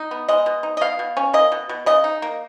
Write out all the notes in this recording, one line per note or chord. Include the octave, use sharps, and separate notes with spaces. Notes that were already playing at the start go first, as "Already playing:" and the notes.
Already playing: D#4
B3
G#3 D#5
B2
D#4
D#5
B2 F5
B2
C#4
A#3 D#5
B2
B2
C#3 D#5
D#4
A#3